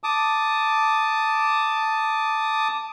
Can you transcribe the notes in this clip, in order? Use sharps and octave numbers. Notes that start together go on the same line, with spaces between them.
A5 D6 D#6